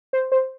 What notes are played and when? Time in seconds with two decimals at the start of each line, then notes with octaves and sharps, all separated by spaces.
0.13 C5
0.32 C5